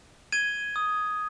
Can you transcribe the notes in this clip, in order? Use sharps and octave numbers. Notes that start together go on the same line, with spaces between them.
G#6 D#7 G7
D#6